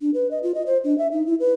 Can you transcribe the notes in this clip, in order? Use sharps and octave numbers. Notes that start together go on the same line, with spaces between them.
D4
B4
D#5
F4
D#5
C5
D4
E5
D#4
E4
B4